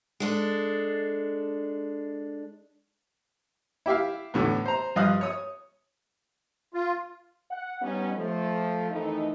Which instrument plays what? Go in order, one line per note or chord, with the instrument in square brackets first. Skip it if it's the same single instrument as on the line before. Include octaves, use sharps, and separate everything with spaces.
[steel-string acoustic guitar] G#3 D4 A4
[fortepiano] E4 G4 E5 F5
E2 A2 D3
C5 A#5
G2 F3 D#5 F5 D#6 F#6
C#5 D#6
[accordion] F4
[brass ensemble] F#5
G3 B3 C#4 D#4
F3 A3
F2 D#3 E3 A3 D#4